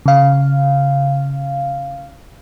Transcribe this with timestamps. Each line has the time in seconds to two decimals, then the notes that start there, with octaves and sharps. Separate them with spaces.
0.06 C#3 F5